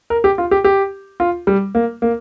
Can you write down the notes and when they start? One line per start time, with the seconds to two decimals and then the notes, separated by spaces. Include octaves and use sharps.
0.10 A#4
0.24 G4
0.38 F4
0.51 G4
0.64 G4
1.20 F4
1.47 G3
1.75 A#3
2.02 A#3